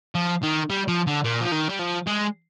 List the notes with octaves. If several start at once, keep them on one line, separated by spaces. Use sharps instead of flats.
F3
D#3
G3
F3
D3
A#2
F3
D#3
G3
F3
G#3